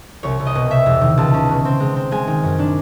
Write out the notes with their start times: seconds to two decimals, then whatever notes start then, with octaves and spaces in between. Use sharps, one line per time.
0.23 C2 C#5
0.40 C2
0.46 D#5
0.55 B2
0.70 C3 E5
0.86 E2
1.01 D#3
1.17 C#2 A5
1.34 C#4
1.49 B2
1.65 C4
1.80 G#3
1.96 C4
2.11 G#3 G#5
2.27 D#3
2.43 F#2
2.59 D4